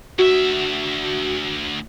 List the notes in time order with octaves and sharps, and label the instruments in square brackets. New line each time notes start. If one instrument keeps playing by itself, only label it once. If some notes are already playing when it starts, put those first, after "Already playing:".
[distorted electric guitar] D2 E5 [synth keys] F#4